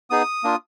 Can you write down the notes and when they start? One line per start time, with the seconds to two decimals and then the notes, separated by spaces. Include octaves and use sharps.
0.10 B3 D#4 G#4 D#6
0.44 A#3 D4 F4